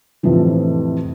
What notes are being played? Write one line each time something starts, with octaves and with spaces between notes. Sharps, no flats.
F2 A2 C3 E3 F3